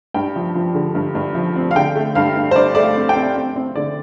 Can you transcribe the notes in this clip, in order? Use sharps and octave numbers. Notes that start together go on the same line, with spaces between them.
G2 G5
F3
F3
D3
G2
G2
F3
C4
F5
D3 G5
A3
G2 F5
G2
C5
G2 D5
A3 D5
F5
C4
G5
C4
C4
C4
D3 D5